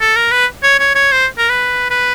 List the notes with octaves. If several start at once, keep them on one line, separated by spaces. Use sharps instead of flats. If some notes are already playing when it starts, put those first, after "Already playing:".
A4
A#4
B4
C#5
C#5
C#5
C5
A#4
B4
B4